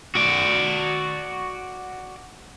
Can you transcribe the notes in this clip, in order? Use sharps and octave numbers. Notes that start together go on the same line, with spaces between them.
F#4 D5